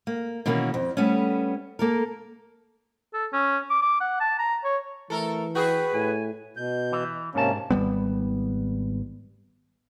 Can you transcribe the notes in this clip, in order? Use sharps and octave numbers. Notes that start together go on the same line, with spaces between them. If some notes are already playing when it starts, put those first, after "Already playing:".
A#3
B2 D#3 E3 A#3 C#4
F2
G3 A3 B3 C#4
A#3 A4 A#4
A4
C#4
D6
D6
F#5
A5
A#5
C#5
E3 A3 A4 A#4
F#4 G#4 B4 G5
A2 G#5
B2 G6
E3
G#2 C3 A#3 C#4 A5
G#1 G3 B3